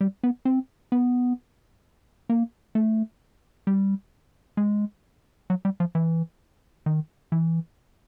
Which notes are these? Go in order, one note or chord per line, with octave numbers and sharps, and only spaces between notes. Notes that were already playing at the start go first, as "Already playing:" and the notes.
G3
B3
C4
B3
A#3
A3
G3
G#3
F#3
G3
F3
E3
D#3
E3